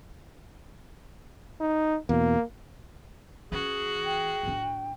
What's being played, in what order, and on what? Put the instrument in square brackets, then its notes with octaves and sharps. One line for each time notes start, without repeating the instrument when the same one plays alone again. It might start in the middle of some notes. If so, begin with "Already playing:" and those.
[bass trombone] D#4
[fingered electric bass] E2 B2 [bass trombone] A#3
[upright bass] E3 C#4 [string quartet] F#4 [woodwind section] G#4
[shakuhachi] G5
[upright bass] A2 D4